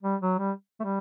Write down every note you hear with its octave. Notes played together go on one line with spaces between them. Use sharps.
G3
F#3
G3
A3
G3